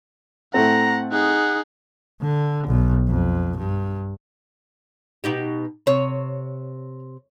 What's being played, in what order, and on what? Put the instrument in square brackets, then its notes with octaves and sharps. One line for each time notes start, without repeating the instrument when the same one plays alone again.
[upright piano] A2 A3 C4 [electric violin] F#5 [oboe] A#5
[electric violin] D#4 G#4 [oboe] F#5
[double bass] D3
B1
F2
G2
[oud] B2 D#4 G4
[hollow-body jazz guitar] C3 [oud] C#5